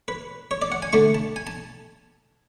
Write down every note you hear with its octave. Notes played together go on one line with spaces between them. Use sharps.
B4
C#5
D5
F#5
G#5
D3 A3 D4 C#6
A5
G#5
A5